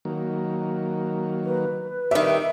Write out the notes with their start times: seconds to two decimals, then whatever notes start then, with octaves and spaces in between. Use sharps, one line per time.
0.05 D#3 F#3 A#3
1.44 B4
2.11 D#3 G3 E5